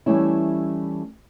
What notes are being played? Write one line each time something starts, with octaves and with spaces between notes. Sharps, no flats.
E3 G3 A3 C#4 E4